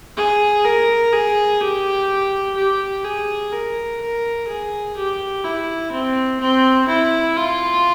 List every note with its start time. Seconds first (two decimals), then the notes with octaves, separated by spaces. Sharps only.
0.17 G#4
0.65 A#4
1.13 G#4
1.61 G4
2.57 G4
3.05 G#4
3.53 A#4
4.01 A#4
4.48 G#4
4.97 G4
5.44 E4
5.92 C4
6.40 C4
6.88 E4
7.36 F4